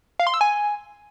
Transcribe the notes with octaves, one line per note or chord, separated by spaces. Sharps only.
F5
C6
E6
G#5